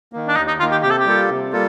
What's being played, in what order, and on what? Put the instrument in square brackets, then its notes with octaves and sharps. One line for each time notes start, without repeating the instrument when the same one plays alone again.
[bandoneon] D#3 A#3
[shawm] D4
[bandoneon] D#2 [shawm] D#4
[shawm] D#4
[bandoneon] D#3 A#3 [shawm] F4
[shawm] G4
[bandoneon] C3 [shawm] G4
[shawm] A4
G4
[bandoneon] G3 A#3 F4 A4
C3
G3 A#3 F4 A4